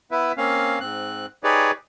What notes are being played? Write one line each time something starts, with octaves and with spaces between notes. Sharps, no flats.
B3 E4 B4 E5
A#3 C4 C#4 F5
G#2 C4 F#6
D#4 G4 G#4 B4 C#5 D5